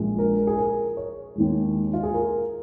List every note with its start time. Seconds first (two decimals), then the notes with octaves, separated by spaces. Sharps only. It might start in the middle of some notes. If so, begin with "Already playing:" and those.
Already playing: A#1 A#2 G#3
0.19 A#4
0.47 G#4
0.58 A#4
0.97 C#5
1.36 D#2 D#3 G#3
1.93 F4
2.03 G#4
2.14 A#4